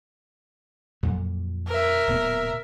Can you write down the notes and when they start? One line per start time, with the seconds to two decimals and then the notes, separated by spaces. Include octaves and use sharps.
1.03 F2 A#2 F#3
1.68 A#4 E5
2.07 D1 A#2 B3